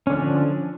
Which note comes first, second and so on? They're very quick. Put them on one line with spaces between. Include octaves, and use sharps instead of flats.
C#4 D3 D4 F3